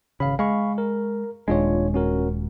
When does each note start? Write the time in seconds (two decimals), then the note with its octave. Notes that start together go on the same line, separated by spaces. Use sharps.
0.20 G#1 C#3 F5 B5
0.39 G#3 F5 B5 C#6
0.78 A#4
1.48 D#1 G#3 D4 F4 C#5
1.94 C#4 F#4 A#4